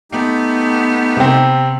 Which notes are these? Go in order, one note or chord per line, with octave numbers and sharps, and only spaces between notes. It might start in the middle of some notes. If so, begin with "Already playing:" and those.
A3 B3 D#4 G4
C3 C4